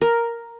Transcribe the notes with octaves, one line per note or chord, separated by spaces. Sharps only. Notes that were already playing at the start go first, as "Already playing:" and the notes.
A#4